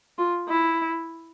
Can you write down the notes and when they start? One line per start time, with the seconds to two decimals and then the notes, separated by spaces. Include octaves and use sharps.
0.18 F4
0.48 E4